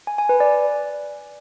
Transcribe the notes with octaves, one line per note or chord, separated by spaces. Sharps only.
G#5
G#5
B4
D5